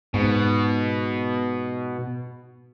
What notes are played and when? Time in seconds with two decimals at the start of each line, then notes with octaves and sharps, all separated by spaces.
0.14 G#2 B2